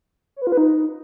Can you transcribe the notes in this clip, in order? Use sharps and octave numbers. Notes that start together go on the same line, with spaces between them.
C#5
B4
F4
B4
D#4